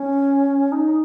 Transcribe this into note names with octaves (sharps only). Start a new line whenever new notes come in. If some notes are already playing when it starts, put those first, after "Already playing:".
Already playing: C#4
D#4